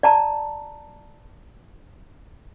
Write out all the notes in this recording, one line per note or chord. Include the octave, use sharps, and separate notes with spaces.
D5 A5 A#5